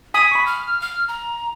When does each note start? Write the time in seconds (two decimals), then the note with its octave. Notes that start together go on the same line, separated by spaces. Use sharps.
0.14 G#5 D#6 B6
0.32 B5 C#6
0.47 F6
0.81 F6
1.09 A#5